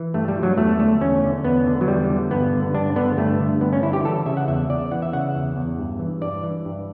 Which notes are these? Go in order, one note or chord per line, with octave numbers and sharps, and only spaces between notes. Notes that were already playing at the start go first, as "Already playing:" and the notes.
Already playing: E3
G2 A3
G3
E3
F#3
E2 A3
D3 A3
E2 C#4
D3
E2 B3
D3
F#3
E2 G3
D3
G2 B3
D3
G2 D4
D3 B3
G2 A3
D3
G2 B3
C#4
D3 E4
G4
E3 A4
C#3 E5
F#5
E2 E5
E2 D5
E3 F#5
E5
C#3 F#5
E2
E2
G2
E3
G2 D5
E3
G2